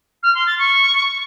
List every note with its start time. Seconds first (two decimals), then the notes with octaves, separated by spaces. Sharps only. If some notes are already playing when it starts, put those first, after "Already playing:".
0.23 F6
0.35 C6
0.46 A6
0.58 C#6